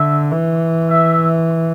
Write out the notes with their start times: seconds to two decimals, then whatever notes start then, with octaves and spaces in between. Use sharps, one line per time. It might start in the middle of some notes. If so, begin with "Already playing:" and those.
Already playing: D3 E5
0.31 E3
0.89 E5